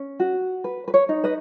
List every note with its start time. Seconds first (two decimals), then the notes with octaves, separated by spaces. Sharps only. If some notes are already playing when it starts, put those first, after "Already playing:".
Already playing: C#4
0.20 F#4
0.64 B4
0.88 B4
0.94 C#5
1.09 D#4
1.24 B4 D#5